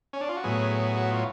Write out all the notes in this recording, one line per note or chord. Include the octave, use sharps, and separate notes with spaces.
C#4
D4
F4
F#4
A2 F#3 B3 G#4
G#4
F#4
F4